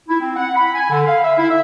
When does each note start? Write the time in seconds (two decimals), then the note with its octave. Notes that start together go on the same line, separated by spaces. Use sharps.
0.09 E4
0.20 C4
0.36 F#5
0.56 B5
0.74 G#5
0.90 D3
1.06 F5
1.22 E5
1.37 E4
1.49 E5